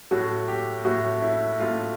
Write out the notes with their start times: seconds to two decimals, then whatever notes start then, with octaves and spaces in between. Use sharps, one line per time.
0.11 A2 F#3 A3 F#4
0.48 G4
0.85 A2 F#3 A3 F#4
1.22 E4
1.60 A2 F#3 A3 F4